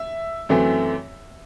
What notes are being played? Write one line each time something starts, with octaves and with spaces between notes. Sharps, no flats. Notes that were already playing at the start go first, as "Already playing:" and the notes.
Already playing: E5
F#2 E3 A3 C4